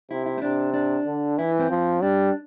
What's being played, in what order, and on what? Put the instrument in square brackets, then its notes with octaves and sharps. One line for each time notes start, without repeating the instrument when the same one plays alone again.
[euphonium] C3 [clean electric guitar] E4
[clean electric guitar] E4
C4
[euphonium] C3 [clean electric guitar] D4
[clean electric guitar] D4
[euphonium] D3
[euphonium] E3 [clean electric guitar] E4
[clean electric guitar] C4
[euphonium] F3
[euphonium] G3 [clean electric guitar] D4